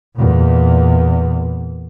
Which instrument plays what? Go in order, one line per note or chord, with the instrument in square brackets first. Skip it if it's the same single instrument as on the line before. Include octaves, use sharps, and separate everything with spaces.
[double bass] E2 A#2